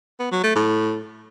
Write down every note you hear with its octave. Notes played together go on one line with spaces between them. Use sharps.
B3
F#3
A3
A2